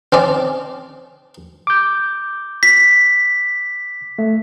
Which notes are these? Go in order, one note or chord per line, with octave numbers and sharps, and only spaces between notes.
C4 C#4 D5
D6 G6
B6
A3